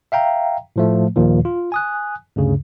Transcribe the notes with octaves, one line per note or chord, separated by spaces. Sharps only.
E5 F5 G5 A#5
A2 F3 A3
D#2 A#2 D#3 F3
F4
G#5 D#6 F#6
D2 G2 C#3